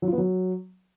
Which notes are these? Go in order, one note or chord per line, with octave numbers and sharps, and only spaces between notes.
F#3
F4
B3
F#3